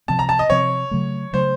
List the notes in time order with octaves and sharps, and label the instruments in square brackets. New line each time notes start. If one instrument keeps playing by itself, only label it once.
[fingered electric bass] C3 F3 C4 [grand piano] A5
[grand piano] A#5
A5
D#5
[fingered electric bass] C3 F3 C4 [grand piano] C#5
[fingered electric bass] C#3 F#3 A3
[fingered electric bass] C#3 F#3 A3 [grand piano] C5